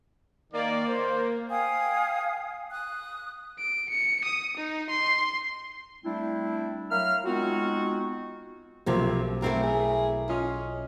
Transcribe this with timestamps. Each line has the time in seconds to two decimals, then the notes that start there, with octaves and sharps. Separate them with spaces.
0.53 D#3 A#3 D5
0.88 C5
1.50 F5 G5 G#5 D#6
2.71 D#6 F#6
3.60 D7
3.90 C#7
4.25 D#6
4.58 D#4
4.90 C6
6.05 G3 A3 C4 D4 E4
6.91 F#3 A#4 E5 F5 F6
7.25 G#3 B3 C4 D#4 F4 F#4
8.86 B1 C3 F3 A#3 A#5
9.42 A3 C4 E4 A#4
9.63 G#4
10.29 C#4 F4 D#5 F5